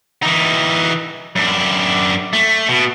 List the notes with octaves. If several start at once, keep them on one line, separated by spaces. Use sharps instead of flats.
E3 D#4
F#2 D4
A3
B2